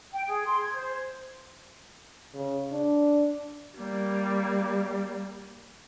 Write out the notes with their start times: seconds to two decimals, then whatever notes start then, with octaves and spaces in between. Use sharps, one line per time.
0.12 G5
0.27 G#4
0.46 C6
0.61 G#6
0.73 C5
2.34 C#3
2.72 D4
3.78 G3 A#3